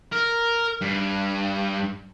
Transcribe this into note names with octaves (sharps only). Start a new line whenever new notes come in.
A#4
G2